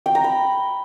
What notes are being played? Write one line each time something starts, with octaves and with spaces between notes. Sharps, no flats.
G5
A#5
B5